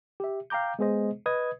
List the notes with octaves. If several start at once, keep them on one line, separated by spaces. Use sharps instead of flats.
G4 E5
F5 G5 A#5 D6 G6
G#3 B3 G#4 C5 D#5
B4 D#5 D#6 G#6